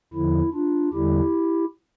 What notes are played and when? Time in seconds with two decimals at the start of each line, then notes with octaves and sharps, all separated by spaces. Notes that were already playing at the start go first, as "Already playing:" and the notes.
0.13 E2 D3 F3 E4
0.53 D4 F4
0.93 E2 D3 G3 E4 G4